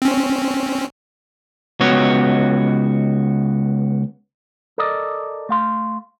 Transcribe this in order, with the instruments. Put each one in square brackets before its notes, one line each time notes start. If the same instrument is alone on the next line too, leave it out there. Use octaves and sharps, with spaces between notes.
[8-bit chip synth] C4 C#4
[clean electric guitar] C#2 B3 F#4 C#5
A4 A#4 D5 D#5
A3 F5 C6